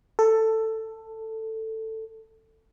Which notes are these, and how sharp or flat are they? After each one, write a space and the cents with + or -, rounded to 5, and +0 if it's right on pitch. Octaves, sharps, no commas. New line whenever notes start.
A4 +10